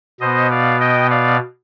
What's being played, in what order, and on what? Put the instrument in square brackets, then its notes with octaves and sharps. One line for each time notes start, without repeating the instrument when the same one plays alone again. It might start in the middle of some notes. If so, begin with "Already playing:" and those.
[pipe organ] B2 B3 C5 D#5
D5 F5
D#5 G5
D5 F5